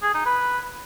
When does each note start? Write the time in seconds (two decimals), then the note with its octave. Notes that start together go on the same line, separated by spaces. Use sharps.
0.02 G#4
0.14 D#4
0.26 B4